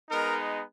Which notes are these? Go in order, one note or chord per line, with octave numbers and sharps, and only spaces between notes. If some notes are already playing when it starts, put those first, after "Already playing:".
G#3 B3 D#4 A#4